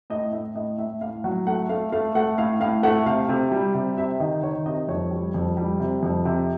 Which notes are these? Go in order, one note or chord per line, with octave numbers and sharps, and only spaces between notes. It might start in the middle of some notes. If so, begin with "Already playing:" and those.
A2 D#5
A2 E5
A2 D#5
A2 E5
A2 F5
F#3 F#5
A3 F#5
A3 F5
A3 F5
A3 F#5
A2 F5
A2 F5
A3 F#5
C3 F5
C3
G3
C3
C3 E5
D#3 D#5
D#3 C#5
C3 D#5
F2 C#5
G3
F2
G3
C3
F2
C3